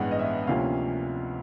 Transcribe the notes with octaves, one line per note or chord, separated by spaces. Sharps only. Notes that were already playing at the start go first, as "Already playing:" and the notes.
Already playing: A1 G2 E3 G#3 B3 F#5
D#5
E5
D2 C3 F3 A#3 C#4 F5